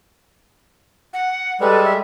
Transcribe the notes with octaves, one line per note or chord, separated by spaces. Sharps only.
F#5
G3 G#3 A4 B4
E5